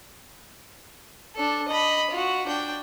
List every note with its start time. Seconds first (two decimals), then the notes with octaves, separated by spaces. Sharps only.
1.35 D4 A4
1.68 D#5 B5
2.10 F4 F#4
2.47 D4 G5